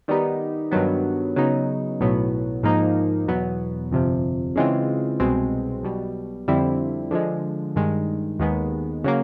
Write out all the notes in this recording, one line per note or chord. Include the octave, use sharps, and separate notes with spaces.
D#3 G3 B3 D#4 G4
G2 D#3 F#3 B3
C#3 F#3 B3 D#4
B1 A2 F#3 B3
G#2 F3 A#3 D#4
E2 B2 F#3 B3
G1 F2 C3 F3
C#3 E3 G#3 C4 F4
C2 B2 G#3 C4
B1 B2 G3
F2 D3 G3 C4 E4
D3 F3 G#3
G2 D#3 G#3
D#2 D#3 G#3 B3
C#3 F#3 A#3